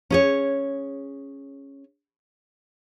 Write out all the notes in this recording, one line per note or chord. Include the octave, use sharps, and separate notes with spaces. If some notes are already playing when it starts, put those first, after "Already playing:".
C#4 G#4 C#5